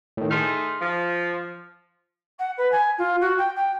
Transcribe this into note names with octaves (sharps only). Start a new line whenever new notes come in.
A2 D#3
A3 D#4 G#4 C6 F6
F3
F#5
B4
G#5
F4
F#4
G5
G5